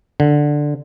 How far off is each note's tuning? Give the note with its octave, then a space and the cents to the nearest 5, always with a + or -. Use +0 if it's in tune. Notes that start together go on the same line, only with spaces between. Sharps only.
D3 +5